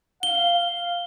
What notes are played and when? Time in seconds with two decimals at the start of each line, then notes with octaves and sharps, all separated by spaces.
0.23 F5 G7